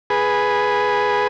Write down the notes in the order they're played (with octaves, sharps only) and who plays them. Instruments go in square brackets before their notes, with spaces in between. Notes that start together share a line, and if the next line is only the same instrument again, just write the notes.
[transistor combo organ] G#4 B4